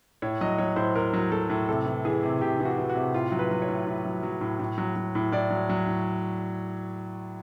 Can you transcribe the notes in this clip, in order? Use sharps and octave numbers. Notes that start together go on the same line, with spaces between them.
A2 C#5
F#3 D#5
F#3 C#5
A2 C5
A2 A#4
F#3
F#3 A4
A2
C3 A4
E3
E3 G#4
C3
C3 G4
E3
F#4
E3
F#4
C3
A2 F4
F#3
B4
F#3
C#5
A2
A2
F#3
F#3
A2
A2
F#3
F#3
A2
A2 D5
F#3
F#3
A2